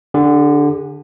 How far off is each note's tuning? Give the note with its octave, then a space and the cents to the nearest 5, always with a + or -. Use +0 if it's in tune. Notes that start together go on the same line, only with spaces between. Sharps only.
D3 +0 G4 +45